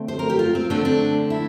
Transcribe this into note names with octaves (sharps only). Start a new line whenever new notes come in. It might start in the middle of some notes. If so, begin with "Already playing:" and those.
Already playing: D3 A3 C4
C5
A#4
G4
F4
C4
D3 A3 C4 D4
D4
E4